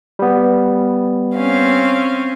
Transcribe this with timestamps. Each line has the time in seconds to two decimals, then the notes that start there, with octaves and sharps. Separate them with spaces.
0.19 G3 B3
1.35 C4 C#4 F5